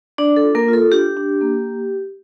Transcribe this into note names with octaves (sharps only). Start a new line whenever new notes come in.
D4 D5
A4
F4
A#3 A#4
F4
A4
D4 G4
D4
A#3